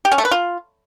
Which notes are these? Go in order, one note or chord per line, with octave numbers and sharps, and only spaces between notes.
G4
C#4
A3
B4
F4